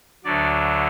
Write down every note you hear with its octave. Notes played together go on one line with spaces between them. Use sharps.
D2 D3 F#3 D5